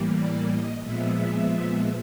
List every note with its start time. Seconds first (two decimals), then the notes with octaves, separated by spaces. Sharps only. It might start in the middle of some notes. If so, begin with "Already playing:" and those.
Already playing: A2 E3 G3 A#3
0.15 D5
0.48 D#5
0.81 A#2 F3 G#3 B3 E5